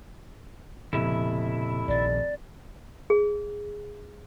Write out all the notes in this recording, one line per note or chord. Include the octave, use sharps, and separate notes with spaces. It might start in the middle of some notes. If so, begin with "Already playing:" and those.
F1 A#2 C#3 E4 E5
A#1 D#3 D5
G#4